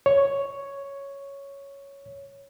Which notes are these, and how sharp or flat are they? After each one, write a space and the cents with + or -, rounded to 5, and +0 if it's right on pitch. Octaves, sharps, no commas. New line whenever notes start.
C#5 +0